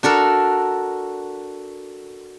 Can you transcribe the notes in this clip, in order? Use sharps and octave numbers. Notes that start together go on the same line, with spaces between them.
D4 F#4 A4 A#4